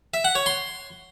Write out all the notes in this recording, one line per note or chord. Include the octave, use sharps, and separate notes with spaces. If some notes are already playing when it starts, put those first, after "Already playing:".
E5
F#5
C#5
C6